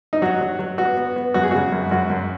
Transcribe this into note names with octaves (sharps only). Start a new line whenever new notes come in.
D#4
F#3 F#4
F#3
F#3
B3 F#4
B3
B3
F#2 F#4
G#4
C#3 F#4
F#2
F#2 F#4
F#2